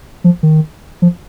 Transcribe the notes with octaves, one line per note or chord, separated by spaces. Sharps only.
F3
D#3
F3